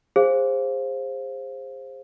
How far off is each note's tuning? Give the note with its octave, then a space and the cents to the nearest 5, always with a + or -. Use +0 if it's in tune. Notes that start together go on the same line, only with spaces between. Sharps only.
G#4 -35 C5 +15 F5 +0